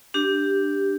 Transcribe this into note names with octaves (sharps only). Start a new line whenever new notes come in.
D4 G4